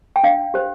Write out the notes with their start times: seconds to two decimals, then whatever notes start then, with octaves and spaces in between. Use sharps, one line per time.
0.16 G5
0.23 D4 F5
0.54 G4 C5